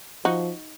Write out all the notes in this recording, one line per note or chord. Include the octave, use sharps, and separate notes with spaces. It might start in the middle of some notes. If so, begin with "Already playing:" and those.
F3 D#4 F#4